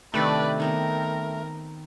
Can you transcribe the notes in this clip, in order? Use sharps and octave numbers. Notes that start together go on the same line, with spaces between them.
C3 D#3 A3 D4 B4 D5
D#3 B3 C4 A#4